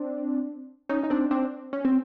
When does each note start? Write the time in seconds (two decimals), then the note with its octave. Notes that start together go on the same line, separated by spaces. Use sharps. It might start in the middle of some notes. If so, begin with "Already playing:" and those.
Already playing: C4 D4
0.89 C#4 D#4
1.03 D#4
1.10 C4 D4
1.31 C4 D4
1.73 C#4
1.85 C4